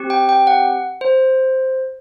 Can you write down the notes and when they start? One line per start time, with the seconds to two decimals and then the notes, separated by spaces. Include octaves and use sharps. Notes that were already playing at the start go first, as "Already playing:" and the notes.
Already playing: C4 G4
0.10 G5
0.29 G5
0.47 F#5
1.01 C5